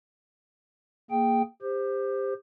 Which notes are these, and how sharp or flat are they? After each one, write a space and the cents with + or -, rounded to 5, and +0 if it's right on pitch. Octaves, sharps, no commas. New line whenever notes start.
A#3 +0 G#4 +0 G5 +0
G4 +25 C5 +0